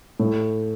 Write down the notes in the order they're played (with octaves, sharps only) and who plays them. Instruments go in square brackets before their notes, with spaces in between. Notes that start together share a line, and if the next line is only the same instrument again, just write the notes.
[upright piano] A2